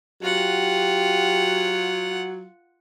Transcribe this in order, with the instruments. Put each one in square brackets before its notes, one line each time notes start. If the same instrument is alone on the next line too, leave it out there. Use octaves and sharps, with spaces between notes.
[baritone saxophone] F#3 [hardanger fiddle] F4 F#5 [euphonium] G4